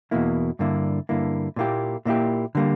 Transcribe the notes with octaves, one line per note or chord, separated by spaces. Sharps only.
E2 B2 A#3 E4
G2 D3 A#3 E4
G2 D3 A#3 E4
A#2 A#3 E4 G4
A#2 A#3 E4 G4
D3 G3 A#3